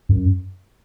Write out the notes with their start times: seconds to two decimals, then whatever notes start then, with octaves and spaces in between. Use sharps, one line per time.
0.09 F#2